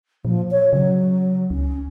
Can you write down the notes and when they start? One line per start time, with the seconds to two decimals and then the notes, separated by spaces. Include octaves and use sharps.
0.25 A#2 F3
0.51 C#5
0.73 C#3 F#3
1.50 C#2 C#4